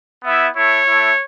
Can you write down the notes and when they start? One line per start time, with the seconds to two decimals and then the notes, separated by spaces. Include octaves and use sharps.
0.24 B3 E4 E5
0.55 A3 E4 C#5
0.87 A3 E4